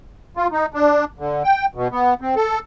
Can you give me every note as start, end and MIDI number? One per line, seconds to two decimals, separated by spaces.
0.37 0.47 65
0.52 0.66 63
0.74 1.05 62
1.19 1.43 50
1.44 1.66 79
1.75 1.88 47
1.92 2.14 59
2.21 2.35 60
2.36 2.59 69